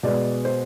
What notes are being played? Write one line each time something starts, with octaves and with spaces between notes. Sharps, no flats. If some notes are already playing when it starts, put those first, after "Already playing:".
B2 G#3 B3 D5
C5